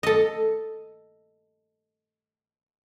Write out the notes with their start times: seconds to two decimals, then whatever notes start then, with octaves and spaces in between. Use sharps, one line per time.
0.03 A4 D#5